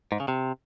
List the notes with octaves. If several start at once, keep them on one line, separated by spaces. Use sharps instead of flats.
G#2
C#3
C3